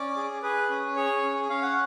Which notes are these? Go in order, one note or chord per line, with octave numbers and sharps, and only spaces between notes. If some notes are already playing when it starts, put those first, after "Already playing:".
Already playing: C#4 D5
G#4
G#4 B4
C#4
G#4 C#5
C#4
C#4 F5
F#5